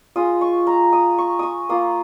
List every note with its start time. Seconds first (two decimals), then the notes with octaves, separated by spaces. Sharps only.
0.16 G#3 F4 D#6
0.41 C#6
0.67 A#5
0.93 D#6
1.18 C#6
1.39 C#6 D#6
1.69 A#3 F4 D#6